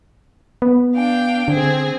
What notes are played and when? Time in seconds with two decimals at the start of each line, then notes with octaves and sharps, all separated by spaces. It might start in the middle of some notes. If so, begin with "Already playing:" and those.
0.62 B3
0.95 D4 F5 G5
1.48 D3 C4 G#4